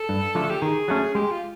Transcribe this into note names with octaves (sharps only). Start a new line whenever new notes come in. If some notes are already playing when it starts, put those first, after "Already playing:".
Already playing: A4
G2
D3 F3 A3
G4
D#3 G#4
F#3 A3 C#4
G#3 G4
F4